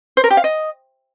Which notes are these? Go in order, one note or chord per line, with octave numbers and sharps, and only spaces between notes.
C5
A#4
G4
F5
D#5